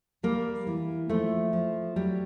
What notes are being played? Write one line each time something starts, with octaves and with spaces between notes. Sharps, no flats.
G3 A#3
E3
F3 A3
F3
F#3 G3